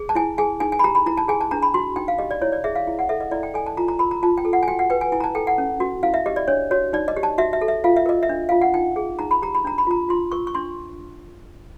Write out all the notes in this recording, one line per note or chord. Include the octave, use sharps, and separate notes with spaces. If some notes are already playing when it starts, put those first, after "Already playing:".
Already playing: G#4
A5
E4 G#5
G#4 G#5
D#4 G#5
G#5
B5
G4 A#5
B5
E4 A#5
A5
G#4 G#5
A5
D4 A#5
B5
F#4 C6
D#4 G5
F5
G4 D#5
D5
E4 C#5
D5
G#4 E5
F5
E4
F#5
A4 E5
D#5
E4 D5
G5
A4 G#5
A5
F4 A#5
A#5
A#4 B5
A#5
F4 A5
G5
A4
F#5
G#5
F#4 G5
F#5
B4 G5
G#5
E4 G#5
A#5
A5
A4 G5
F#5
C#4
F#4
E4 F5
E5
G4 D#5
D5
D4 C#5
F#4 C#5
D#4 D5
D#5
G4
A5
F#4 E5
E5
A4
E5
F4 F5
E5
A#4 D#5
E5
D4
F4 F5
F#5
D#4 G5
G#4
D#4 A#5
B5
G4 A#5
B5
D4 A#5
B5
F4 A#5
F4 C6
A#4 C#6
C#6
D4 C6